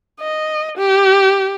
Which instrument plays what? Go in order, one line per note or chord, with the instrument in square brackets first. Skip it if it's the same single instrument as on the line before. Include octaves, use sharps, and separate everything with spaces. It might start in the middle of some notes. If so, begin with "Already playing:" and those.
[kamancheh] D#5
G4